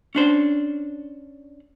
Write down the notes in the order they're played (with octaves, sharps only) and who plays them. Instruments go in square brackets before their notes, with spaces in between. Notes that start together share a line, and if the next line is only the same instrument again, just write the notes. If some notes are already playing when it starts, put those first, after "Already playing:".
[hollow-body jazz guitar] C#4 D4 C5